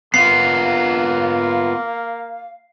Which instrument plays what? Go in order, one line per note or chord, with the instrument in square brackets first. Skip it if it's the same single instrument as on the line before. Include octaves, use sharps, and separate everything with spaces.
[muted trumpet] A#3 [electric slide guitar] B3 F4 [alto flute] F5 [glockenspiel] C7